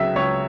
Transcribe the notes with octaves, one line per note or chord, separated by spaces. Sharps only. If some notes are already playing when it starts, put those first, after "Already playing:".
Already playing: C#2 C#3 F#3 E5
C#2 C#5